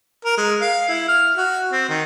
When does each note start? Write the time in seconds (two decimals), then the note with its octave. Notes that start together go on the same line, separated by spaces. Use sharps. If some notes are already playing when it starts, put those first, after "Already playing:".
0.25 A#4
0.37 G#3
0.62 F5
0.89 E4
1.08 F6
1.37 F#4
1.72 C4
1.89 D#3